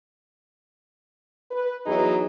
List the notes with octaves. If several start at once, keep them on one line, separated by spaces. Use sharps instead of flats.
B4
E2 F#3 D#4 G#4 B4